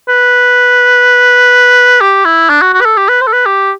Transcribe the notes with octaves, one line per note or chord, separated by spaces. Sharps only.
B4
G4
E4
D4
F#4
F#4
B4
A4
G4
B4
C5
A4
B4
G4